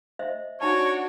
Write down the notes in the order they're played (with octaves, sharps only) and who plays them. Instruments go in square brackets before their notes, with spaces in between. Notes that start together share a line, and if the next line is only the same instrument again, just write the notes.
[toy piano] C5 D#5 E5
[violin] D4 F#4 [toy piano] D#4 G#5 A5 [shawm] C#5